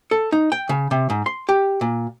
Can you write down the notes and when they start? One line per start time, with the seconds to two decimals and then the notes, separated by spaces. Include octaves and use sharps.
0.11 A4
0.32 D#4
0.52 G5
0.69 C#3
0.91 C3
1.10 G#2
1.26 C6
1.49 G4
1.81 A#2